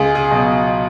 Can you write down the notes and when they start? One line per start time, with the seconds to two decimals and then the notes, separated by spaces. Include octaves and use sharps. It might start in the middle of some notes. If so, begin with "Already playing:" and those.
Already playing: C#2 G#4
0.15 G#4
0.31 B2 F#3